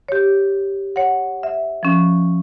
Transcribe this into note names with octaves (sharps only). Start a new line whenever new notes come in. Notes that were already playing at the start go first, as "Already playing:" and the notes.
G4 C#5
C#5 F#5
E5
F3 C#4